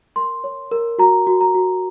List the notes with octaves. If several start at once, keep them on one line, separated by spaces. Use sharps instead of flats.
A#4 C6
C#5
A#4
F#4 A#5
F#4
A#5
F#4